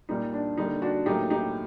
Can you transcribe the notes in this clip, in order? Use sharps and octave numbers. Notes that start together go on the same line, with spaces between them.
A#2 G3 A#3 D#4
D4
D3 G3 A#3 D#4
D4 F#4
A2 F#3 A#3 D#4 G4
D#4 G4